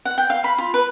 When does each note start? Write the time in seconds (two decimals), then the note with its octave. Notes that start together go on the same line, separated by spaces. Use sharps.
0.05 F#5
0.18 G5
0.30 F5
0.44 B5
0.58 F4
0.74 B4